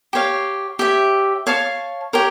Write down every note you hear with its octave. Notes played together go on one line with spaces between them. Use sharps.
G4 C#5 F5
G4 C#5 E5
C#5 F5 A5 C#6
G4 A#4 C#5